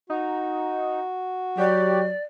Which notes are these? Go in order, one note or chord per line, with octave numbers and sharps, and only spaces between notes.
D#4 F#4
F#3 G4 D5